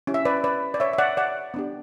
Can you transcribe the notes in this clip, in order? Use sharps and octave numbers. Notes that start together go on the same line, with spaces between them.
C#4 E4 G4
E5
B4 D5
B4 D5
D5
C#5 E5
E5
D5 F#5
D5 F#5
B3 D4 G4